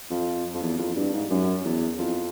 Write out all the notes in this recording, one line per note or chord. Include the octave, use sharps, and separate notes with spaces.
F2
F2
E2
F2
G2
G#2
F#2
E2
F2